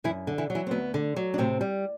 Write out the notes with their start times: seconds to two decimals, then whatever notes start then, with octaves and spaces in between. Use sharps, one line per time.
0.04 F#2 E3 E4
0.27 D3
0.38 E3 E4
0.50 F#3
0.55 E3 E4
0.67 C4
0.71 D2 B3
0.94 D3
1.16 F#3
1.34 D4
1.38 A2 C3 C4
1.61 G3